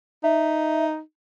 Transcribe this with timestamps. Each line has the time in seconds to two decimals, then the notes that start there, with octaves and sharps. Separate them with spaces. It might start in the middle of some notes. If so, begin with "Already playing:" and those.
0.24 D#4 E5